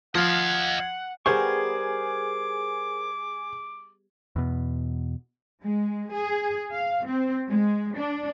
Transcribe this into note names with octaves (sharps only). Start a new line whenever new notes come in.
F3 D#5 F5 F#5 G#6
G3 B3 G#4 A#4 C5 C#6 D6
E2 B2
G#3
G#4
F5
C4
G#3
D4